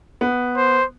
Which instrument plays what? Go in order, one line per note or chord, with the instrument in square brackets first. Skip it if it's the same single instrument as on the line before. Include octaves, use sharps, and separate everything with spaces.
[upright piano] B3
[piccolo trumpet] C5